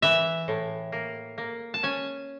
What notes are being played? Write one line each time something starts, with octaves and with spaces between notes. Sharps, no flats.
E3 E5
A2
A#3
A#3
A5
C#4 G#5